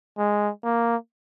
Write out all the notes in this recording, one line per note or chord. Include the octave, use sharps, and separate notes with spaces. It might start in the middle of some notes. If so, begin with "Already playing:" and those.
G#3
A#3